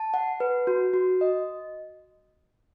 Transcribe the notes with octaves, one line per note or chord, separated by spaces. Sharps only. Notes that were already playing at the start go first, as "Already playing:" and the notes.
Already playing: A5
F#5
B4
F#4
F#4
D#5